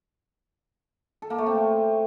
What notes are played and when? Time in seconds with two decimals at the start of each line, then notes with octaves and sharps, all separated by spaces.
1.22 A4
1.30 A#3
1.38 A3
1.46 C4